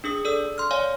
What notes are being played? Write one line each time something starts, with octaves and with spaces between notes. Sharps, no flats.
D4 G#4 D#6
A4 D5 E6
C6 F6
C#5 D5 F5 G#5